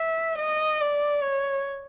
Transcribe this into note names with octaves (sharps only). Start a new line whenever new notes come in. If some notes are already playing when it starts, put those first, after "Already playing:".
Already playing: E5
D#5
D5
C#5